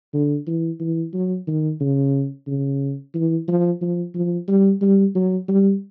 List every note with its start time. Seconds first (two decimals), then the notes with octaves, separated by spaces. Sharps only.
0.13 D3
0.47 E3
0.80 E3
1.14 F#3
1.47 D#3
1.81 C#3
2.47 C#3
3.14 E3
3.48 F3
3.81 F3
4.15 F3
4.48 G3
4.81 G3
5.15 F#3
5.48 G3